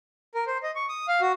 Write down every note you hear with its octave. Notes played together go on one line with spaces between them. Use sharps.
A#4
C5
D#5
C#6
D#6
F5
F#4